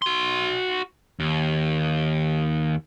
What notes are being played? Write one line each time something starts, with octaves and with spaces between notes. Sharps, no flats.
F#4 C6
D#2